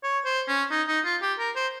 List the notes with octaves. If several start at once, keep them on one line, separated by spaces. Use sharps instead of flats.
C#5
C5
C#4
D#4
D#4
F4
G4
A#4
C5